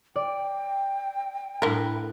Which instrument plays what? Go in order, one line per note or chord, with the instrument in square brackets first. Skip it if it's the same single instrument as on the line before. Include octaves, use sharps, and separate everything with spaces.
[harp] D5 [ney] G5
[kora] A2 B4 [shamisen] D3 A#4